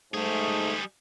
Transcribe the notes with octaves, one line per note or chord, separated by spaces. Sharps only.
G#2 G3 A3 G#4